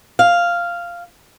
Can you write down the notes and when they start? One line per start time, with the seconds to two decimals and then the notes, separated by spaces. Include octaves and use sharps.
0.19 F5